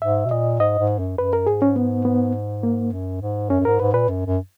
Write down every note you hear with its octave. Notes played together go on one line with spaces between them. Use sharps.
G#2 E5
B2
A#2 D#5
G#2 D#5
G#2
F#2
F#2 B4
A#4
G#2 G#4
C#4
B3
B3
A#3
F#2
G#2
F#2 C#4
F#2
G#2 A#4
G#2 B4
A#2 B4
F#2
F#2